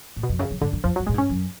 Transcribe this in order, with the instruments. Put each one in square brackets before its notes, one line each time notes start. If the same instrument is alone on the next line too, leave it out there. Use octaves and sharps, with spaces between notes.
[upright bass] A2
[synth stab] B2
[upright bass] F2
[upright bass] F#2 [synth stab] C#3
[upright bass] F#2
[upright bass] G#2 [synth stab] D3
[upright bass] F#2
[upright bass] F2 [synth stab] F3
[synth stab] F#3
[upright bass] F#2
[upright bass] A2 [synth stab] G#3
[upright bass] G#2
[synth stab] C#4
[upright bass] F#2